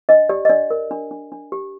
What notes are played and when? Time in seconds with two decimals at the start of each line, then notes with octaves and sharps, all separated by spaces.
0.09 D4 D#5
0.29 G4 D5
0.45 D#5
0.49 D4 D5
0.70 A#4
0.91 D4
1.11 D4
1.32 D4
1.52 G4